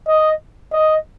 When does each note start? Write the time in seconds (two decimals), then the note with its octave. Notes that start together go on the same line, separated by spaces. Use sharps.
0.08 D#5
0.73 D#5